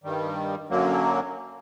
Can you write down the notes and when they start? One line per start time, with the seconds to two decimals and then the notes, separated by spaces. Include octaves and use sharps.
0.04 G2 D#3 G3
0.69 F#2 D3 F#3 A#3